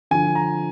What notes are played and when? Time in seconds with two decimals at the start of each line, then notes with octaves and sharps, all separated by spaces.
0.11 D3 F3 G#5
0.35 A#5